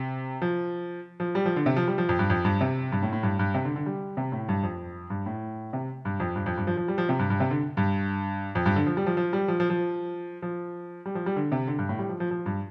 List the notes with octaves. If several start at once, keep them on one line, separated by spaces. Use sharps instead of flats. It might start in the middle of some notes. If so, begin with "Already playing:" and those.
Already playing: C3
F3
F3
G3
F3
D3
C3
F3
G3
F3
F2
G2
F2
G2
C3
G2
A2
A2
G2
G2
C3
D3
D3
G3
C3
A2
G2
F2
G2
A2
C3
G2
F2
G2
F2
G2
F3
F3
G3
F3
C3
G2
G2
C3
D3
G2
F2
G2
D3
F3
G3
F3
F3
G3
F3
F3
F3
F3
G3
F3
G3
D3
C3
D3
G2
A2
G3
F3
F3
F3
G2